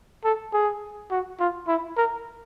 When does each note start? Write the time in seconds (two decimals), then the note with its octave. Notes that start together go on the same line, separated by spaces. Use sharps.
0.24 A4
0.53 G#4
1.11 F#4
1.40 F4
1.67 E4
1.97 A#4